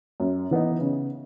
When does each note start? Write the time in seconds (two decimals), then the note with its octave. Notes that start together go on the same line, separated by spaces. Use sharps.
0.20 F#2
0.51 E3 B3 D#4
0.81 C#3